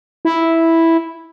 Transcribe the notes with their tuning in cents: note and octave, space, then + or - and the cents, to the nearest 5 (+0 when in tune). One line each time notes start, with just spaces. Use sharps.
E4 -5